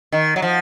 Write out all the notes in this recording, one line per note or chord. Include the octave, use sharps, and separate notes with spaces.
D#3
F#3
F3